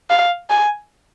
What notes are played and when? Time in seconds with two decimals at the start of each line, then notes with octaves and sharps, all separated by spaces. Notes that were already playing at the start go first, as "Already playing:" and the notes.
0.10 F5
0.50 G#5